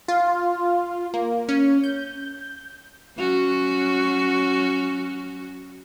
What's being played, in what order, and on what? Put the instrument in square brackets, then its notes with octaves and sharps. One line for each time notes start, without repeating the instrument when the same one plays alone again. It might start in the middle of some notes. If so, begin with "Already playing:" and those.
[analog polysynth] F4
A#3
C#4
G6
[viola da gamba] F#3 C#4 F#4